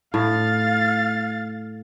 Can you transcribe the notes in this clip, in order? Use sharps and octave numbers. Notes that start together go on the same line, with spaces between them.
A2 F5 A6